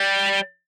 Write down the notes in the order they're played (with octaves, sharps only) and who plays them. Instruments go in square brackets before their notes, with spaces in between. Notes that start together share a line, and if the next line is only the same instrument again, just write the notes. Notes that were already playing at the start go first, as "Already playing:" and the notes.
Already playing: [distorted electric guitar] G3